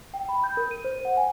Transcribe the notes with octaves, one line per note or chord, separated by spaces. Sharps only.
G5
B5
G6
A#4
D#7
C5
F#5
G#5